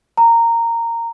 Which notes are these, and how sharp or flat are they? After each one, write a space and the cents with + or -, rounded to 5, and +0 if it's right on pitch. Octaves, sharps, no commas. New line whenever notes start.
A#5 -15